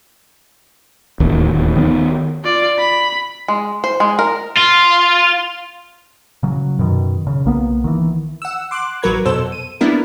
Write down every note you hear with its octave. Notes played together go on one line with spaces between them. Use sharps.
D1 D#2
D#3 B3
F4 D5
B5
G#3
C5
G#3
A#4
F4
C#3 F#3
F#2 B2 D#3
C#3
B1 A#3 B3
D#3 E3
F#5 E6
C6 D6 F#6
A1 F#3 F#4 A#4 B4 G#6
F2 B2 A4 C5 E6
D#7
G3 A#3 B3 D4 E4 A#4